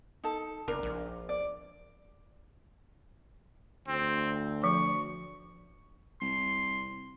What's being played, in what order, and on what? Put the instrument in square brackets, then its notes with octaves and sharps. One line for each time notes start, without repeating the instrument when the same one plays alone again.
[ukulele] D#4 A4
[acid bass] F#1 [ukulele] D4 A#4
[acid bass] A#1
[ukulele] D5
[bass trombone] D2 [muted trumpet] C4
[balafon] F3 [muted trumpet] C#6
[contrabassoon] C2 [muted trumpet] C6